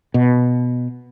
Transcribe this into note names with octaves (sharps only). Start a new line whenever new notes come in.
B2